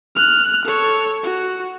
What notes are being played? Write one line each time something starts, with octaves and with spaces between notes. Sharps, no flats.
F6 F#6
A4 C#5
F#4